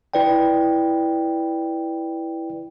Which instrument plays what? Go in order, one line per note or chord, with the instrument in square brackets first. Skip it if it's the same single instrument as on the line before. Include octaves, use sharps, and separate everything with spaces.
[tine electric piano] E4 B4 D5 G5